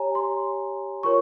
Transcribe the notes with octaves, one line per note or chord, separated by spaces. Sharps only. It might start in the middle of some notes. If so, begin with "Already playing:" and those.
Already playing: G4 C#5 G#5 A#5
C6
F4 A#4 C#5 C#6